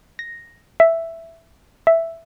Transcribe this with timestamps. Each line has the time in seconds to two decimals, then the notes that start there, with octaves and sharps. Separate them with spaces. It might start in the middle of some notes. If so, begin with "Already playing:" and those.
0.19 A#6
0.80 E5
1.87 E5